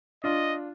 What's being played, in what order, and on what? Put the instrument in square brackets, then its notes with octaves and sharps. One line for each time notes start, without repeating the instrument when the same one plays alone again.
[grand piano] D4 F4 [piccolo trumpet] D#5